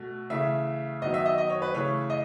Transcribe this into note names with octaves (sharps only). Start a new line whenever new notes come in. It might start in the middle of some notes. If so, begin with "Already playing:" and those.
Already playing: B2 A3
C#3 E3 A3 E5
D#3 F#3 B3 D#5
E5
D#5
D#5
C#5
B4
C#3 E3 A3 C#5
D#5